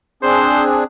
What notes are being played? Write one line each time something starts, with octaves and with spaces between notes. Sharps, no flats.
C4 D4 G#4 C5